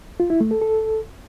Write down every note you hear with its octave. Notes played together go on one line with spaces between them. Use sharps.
F4
E4
A3
A4
A4